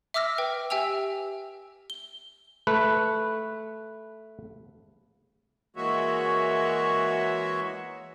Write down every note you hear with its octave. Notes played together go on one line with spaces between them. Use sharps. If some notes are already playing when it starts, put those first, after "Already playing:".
E5 D6 E6 F6 A#6
B4 G5
G4 E5 G5 G#5 E6 F7
G7
A3 B4
E3 G#3 A#3 F#4 C#5 E5